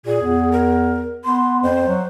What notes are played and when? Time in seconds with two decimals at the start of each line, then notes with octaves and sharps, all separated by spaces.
0.06 A#2 G#4
0.21 E2
0.52 A#4
1.25 B3 C6
1.63 F2 C5
1.87 F#3